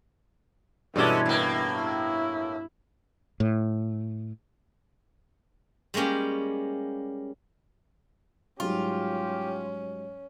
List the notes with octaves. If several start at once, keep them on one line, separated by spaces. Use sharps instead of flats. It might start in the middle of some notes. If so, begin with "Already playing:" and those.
G2 B2 E3 G#3 C#4 A4 D5
A2 A#3
E4
A2
G3 G#3 A#3 C#4 G4
G#2 F#3 G3 C#4 F4 G4